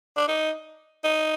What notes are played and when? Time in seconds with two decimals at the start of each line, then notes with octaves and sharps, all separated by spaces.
0.17 D4
0.28 D#4
1.04 D#4